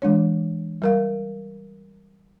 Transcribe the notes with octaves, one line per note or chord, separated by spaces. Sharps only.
E3 G#3 D4 C#5
G3 A#4 F5